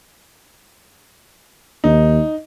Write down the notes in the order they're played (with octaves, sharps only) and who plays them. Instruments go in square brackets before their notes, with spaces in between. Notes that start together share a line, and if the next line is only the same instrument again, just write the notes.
[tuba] D#2 [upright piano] D#4